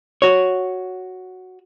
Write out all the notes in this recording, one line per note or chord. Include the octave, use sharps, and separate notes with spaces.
F#4 C#5